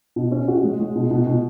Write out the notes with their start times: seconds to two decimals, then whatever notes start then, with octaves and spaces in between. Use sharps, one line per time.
0.16 B2
0.32 C#4
0.48 F#4
0.63 G#3
0.79 G#3
0.96 B2
1.11 B2
1.27 B2